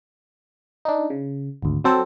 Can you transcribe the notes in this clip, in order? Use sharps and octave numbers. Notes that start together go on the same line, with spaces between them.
D4 D#4
C#3
G#1 D2
F#3 C4 A4 C5